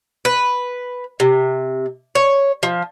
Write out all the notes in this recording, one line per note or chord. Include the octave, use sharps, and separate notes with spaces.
B4
C3
C#5
F3